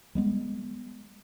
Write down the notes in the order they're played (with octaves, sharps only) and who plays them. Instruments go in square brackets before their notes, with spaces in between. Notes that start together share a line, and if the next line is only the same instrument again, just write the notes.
[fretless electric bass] G3 G#3 B3